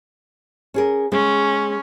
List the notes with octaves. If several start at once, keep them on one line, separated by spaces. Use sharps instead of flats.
C#4 G#4 A#4
G#3 C#4